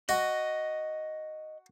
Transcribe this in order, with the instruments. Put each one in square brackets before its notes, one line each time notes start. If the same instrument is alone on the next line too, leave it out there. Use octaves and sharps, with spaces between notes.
[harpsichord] F#4 [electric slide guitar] D#5